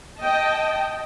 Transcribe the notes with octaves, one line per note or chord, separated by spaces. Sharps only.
D#5 G5 A5